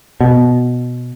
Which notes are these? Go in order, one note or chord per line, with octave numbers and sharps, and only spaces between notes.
B2